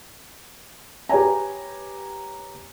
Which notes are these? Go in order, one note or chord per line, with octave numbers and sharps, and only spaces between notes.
G4 B4 C#5 G#5 A#5